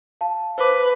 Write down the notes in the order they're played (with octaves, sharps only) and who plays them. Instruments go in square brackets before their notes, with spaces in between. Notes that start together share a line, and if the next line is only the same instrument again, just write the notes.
[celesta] F5 A5
[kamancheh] B4 [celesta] C5 D6